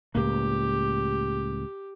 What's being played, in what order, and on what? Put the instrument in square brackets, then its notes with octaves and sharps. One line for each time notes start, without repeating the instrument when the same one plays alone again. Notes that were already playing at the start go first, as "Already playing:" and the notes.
[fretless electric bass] C#2 A2 A#3 [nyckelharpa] G4